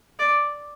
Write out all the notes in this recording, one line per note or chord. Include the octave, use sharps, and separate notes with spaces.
D5